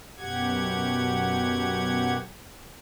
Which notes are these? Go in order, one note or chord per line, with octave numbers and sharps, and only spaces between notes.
F#2 B2 G4 F#5 G#6